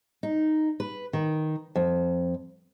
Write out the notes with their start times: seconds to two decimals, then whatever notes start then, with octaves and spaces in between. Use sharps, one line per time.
0.23 D#4
0.80 B4
1.13 D#3
1.76 F2